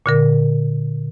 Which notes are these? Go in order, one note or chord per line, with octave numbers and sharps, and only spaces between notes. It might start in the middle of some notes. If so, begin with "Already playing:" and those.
A#2 D3 A#4